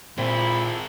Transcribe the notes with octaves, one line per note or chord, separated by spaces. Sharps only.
A#2 G#3 C4 E4 F4 A4 A#4 B5